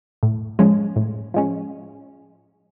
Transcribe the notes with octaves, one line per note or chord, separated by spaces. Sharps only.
A2
F3 G#3 C#4
A2
F3 G#3 C#4